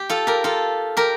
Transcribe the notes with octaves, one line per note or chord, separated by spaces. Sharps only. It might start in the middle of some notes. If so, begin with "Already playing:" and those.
Already playing: G4
F4 A4
G4 A#4
F4 A4
G4 A#4